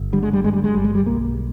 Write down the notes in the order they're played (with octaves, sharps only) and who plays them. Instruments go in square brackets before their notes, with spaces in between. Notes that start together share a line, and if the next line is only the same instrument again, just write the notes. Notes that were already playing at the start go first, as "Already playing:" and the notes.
Already playing: [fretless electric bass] G1
D3 G3
G#3
G3
G2 G#3
G3
G#3
G1 G3
G#3
G3
B1 A#3